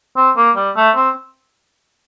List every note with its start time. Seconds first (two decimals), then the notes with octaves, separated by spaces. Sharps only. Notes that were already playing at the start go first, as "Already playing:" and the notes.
0.17 C4
0.36 A#3
0.56 G3
0.76 A3
0.96 C4